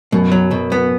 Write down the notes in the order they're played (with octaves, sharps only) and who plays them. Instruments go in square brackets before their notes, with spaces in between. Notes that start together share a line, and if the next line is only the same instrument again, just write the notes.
[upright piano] F#2 [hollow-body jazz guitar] B2
[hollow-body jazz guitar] F#3
B2
B3